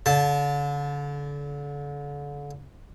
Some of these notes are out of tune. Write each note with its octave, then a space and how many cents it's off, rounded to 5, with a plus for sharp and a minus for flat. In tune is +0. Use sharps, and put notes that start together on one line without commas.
D3 -35 A5 +0